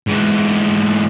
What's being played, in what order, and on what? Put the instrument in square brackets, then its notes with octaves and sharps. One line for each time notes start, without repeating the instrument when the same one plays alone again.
[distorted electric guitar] G#2 E3